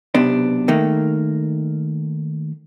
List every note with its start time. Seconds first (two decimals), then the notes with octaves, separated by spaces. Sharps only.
0.15 B1 C3 B3 D4
0.68 D#3 A3 A#3